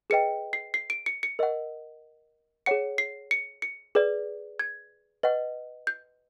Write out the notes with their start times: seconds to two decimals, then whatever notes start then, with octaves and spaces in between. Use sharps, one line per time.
0.10 G#4 B4 D#5 G5 C#7
0.53 C7
0.74 C7
0.90 D7
1.06 C#7
1.23 C#7
1.39 A#4 D#5 F#5
2.66 G#4 C#5 F#5 C#7
2.98 C7
3.31 C#7
3.62 C#7
3.95 G#4 B4 D5
4.59 G#6
5.23 B4 D#5 F#5
5.87 G6